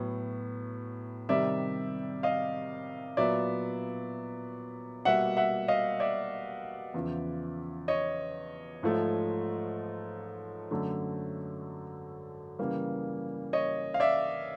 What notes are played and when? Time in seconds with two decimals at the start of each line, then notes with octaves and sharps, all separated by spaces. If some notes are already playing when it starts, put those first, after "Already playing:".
Already playing: A2 F#3 B3
1.29 C3 D#3 G3 D5 E5
2.23 D#5 F5
3.17 A#2 F#3 B3 D5 E5
5.05 B2 G3 A#3 E5 F#5
5.37 E5 F#5
5.68 D#5 F5
6.00 D5 E5
6.94 E2 C#3 F3
7.88 C#5 D#5
8.83 G#2 F3 A3
10.71 F#2 D3 F#3 A3
12.59 C#3 E3 G3 A#3
13.53 C#5 D#5
13.94 F5
14.00 D5 E5